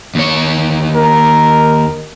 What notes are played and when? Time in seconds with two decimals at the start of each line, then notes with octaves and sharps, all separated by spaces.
0.15 D#2 C#5
0.95 A#4